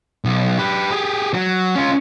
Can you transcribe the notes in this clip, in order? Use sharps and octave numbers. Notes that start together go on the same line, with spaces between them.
B1
G4 B4
G4 G#4
F#3
C#4 F4